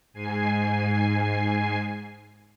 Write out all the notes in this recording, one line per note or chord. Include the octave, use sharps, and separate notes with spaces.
G#2 G#5 C7